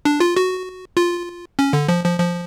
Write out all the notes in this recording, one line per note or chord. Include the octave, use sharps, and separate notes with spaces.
D4
F4
F#4
F4
C#4
D3
F3
F3
F3